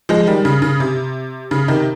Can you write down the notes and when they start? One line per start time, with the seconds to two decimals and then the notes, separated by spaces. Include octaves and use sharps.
0.09 F3 G#3
0.27 D#3 G3
0.45 C#3
0.62 C#3
0.80 C3
1.51 C#3
1.68 C3 D#3